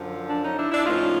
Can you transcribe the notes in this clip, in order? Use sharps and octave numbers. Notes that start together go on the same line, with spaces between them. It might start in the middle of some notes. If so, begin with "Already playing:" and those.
Already playing: F#2 D3 F3
D4
C#4 D#4
D4 E4
D4 E4
A2 F3 A#3 C#4 D#4 F4